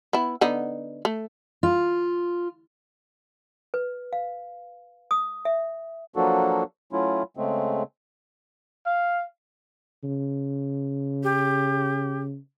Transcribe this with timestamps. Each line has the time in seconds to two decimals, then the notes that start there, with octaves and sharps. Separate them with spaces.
0.13 B3 E4
0.41 D3 B3 D#4
1.05 A3
1.63 F4
3.74 B4
4.13 F5
5.11 D#6
5.45 E5
6.16 F3 F#3 A#3 D4 F#4 A4
6.93 F#3 A3 C#4 E4 F4
7.37 C#3 G#3 A3 C4
8.86 F5
10.04 C#3
11.23 G4